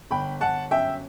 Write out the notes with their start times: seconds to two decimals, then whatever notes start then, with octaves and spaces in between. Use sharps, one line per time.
0.11 G1 G5 B5
0.41 G1 F#5 A5
0.71 F#2 E5 G5